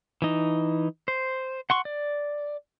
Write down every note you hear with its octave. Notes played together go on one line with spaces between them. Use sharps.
E3 D#4
C5
F#5 C6 C#6
D5